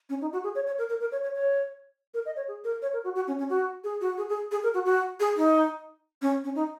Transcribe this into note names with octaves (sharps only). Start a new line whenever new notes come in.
C#4
D#4
F#4
G#4
C#5
C#5
A#4
A#4
A#4
C#5
C#5
C#5
A#4
D#5
C#5
G#4
A#4
C#5
A#4
F#4
F#4
C#4
C#4
F#4
G#4
F#4
G#4
G#4
G#4
A#4
F#4
F#4
G#4
D#4
C#4
C#4
D#4